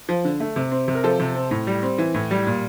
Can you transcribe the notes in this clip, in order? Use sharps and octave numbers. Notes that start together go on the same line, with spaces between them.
F3
D3
A3
C3
C4
C3
A#4
F3 A4 C5
C3
C4
A2
G3
C4
E3
A2
G3
A#2